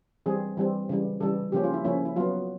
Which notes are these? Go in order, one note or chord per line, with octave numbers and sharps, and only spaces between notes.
E3 G3 C4 G#4
E3 G3 C4
C#3 E3 G3
C#3 E3 G3 A4
C#3 F3 A#3 C#4 G4
F4
E4
C#3 F3 A#3 C#4 E4
E4
F#3 B3 F4